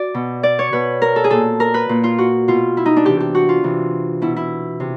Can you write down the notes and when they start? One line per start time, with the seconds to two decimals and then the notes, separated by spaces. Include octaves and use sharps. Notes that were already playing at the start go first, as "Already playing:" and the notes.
Already playing: F#4 D5
0.14 B2
0.43 D5
0.59 C#5
0.73 B2 B4
1.02 A#4
1.16 A4
1.24 G#4
1.30 A#2 A4
1.60 A#4
1.74 B4
1.89 A#2
2.04 F4
2.18 F#4
2.48 B2 F4
2.77 E4
2.86 D#4
2.96 D4
3.05 C3 E3 G4
3.20 G4
3.35 F#4
3.49 F4
3.64 C3 E3
4.22 B2 E4
4.36 E4
4.80 C3